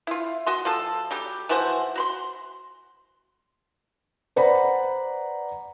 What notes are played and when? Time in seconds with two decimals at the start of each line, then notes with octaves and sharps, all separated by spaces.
0.07 E4 F4
0.46 F#4 D#5 C6
0.65 F3 F4 A4
1.11 F#3 G3 G4
1.49 E3 F3 F#4 C5
1.96 F#4 B5 C6
4.36 B4 C5 D5 F#5 A#5 B5